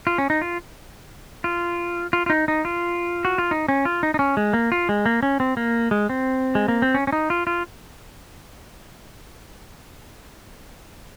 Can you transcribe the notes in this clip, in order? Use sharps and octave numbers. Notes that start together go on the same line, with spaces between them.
F4
C#4
D#4
F4
F4
F4
F4
D#4
D#4
F4
F#4
F4
D#4
C#4
F4
D#4
D#4
C#4
G#3
A#3
F4
G#3
A#3
C#4
C4
A#3
G#3
C4
G#3
A#3
C4
C#4
C#4
D#4
F4
F4